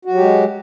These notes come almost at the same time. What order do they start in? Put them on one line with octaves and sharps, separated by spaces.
F#4 F#3 G4 G#3